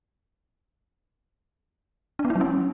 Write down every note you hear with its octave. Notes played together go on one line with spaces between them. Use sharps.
D4
B3
E4
F#3
C#4